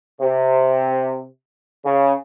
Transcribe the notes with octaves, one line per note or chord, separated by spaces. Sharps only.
C3
C#3